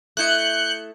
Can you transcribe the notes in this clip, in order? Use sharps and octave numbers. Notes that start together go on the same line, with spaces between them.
A3 E4 D#5 F#6 G6 C#7